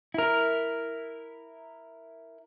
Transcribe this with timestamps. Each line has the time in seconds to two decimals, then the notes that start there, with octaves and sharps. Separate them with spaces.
0.14 E4 A#4